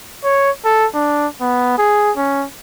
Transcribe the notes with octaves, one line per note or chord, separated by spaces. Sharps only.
C#5
A4
D4
B3
G#4
C#4